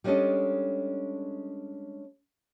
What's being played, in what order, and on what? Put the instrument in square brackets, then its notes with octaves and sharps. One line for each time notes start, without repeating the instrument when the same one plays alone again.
[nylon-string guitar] G3 G#3 C#4 D4 A4 D#5